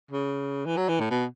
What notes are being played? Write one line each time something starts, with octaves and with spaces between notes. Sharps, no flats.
C#3
E3
F#3
E3
A2
B2